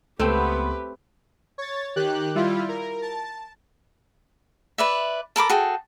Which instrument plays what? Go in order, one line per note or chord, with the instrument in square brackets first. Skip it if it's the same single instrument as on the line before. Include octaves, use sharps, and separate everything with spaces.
[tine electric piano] C#2 C6 [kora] A3 C4 G5 [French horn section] B3 [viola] G4 B4
[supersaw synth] C#5 A6
D#3 G4 F#6
G3 E4 F4
A#4
A5
[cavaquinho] B4 D5 E5
A4 A#4 B5 D6
F#4 G#4 A4 G5